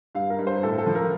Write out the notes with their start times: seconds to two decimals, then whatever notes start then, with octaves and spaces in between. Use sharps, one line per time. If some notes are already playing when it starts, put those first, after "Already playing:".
0.15 G2 F5
0.30 A#4
0.39 G2
0.47 C5
0.63 A2 A4
0.78 A4
0.86 F3
0.95 A#4